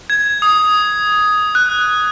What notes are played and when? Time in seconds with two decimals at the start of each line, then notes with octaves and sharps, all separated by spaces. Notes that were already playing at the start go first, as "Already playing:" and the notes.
0.10 G#6
0.42 D#6
1.55 F#6